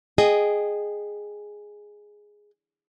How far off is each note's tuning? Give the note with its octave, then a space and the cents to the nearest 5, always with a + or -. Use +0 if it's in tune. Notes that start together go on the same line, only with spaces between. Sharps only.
G#4 +0 D#5 -15 G5 +0